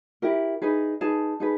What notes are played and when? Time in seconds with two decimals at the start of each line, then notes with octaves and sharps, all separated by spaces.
0.22 E4 G4 A#4
0.62 D#4 G#4 B4
1.01 D#4 G#4 B4 A5
1.40 D#4 G#4 B4